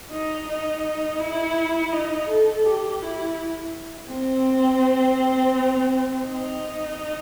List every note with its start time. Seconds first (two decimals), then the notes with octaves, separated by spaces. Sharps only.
0.11 D#4
0.48 D#4
1.20 E4
1.92 D#4
2.29 A4
2.65 G4
3.02 E4
4.10 C4
6.27 D#4